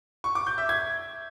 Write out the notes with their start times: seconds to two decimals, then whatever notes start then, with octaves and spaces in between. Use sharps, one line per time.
0.24 C#6
0.35 D6
0.47 G6
0.58 E5
0.69 G#6